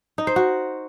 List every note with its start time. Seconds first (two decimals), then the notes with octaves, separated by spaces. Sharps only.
0.18 D#4
0.27 C5
0.36 F#4